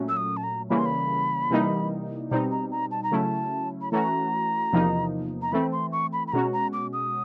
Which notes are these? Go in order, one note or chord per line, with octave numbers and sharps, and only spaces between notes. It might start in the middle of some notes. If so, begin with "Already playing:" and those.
Already playing: A#2 F#3 A3 C#4
E6
D#6
A5
A#5
C#3 E3 G3 A#3 C#4 B5
C6
B5
C3 E3 G3 A#3 D#4
B2 G3 C4 D#4 A#5
A#5
A#5
A5
A#5
C#3 F#3 A3 C#4 E4 A5
B5
E3 A3 C#4 F#4 A#5
E2 C3 F3 A#3 D#4
A#5
E3 A3 C4 B5
C6
C#6
B5
B5
B2 G#3 C#4 F#4 A#5
A#5
D6
D#6